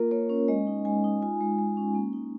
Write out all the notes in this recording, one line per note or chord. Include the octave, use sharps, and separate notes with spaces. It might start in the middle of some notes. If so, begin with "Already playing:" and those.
Already playing: A#3 F4 A#4
A#3 C#5
C#4
G#3 D#5
D#4
G#3 G#5
D#4
F4 G#5
G#3
G#3
C#4
A#3
D#4